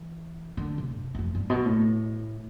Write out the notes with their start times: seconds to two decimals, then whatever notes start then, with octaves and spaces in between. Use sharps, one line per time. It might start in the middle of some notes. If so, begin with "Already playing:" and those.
Already playing: E3
0.57 D3
0.78 C3
0.99 E2
1.15 E2
1.19 F2
1.35 G2
1.50 B2
1.66 A2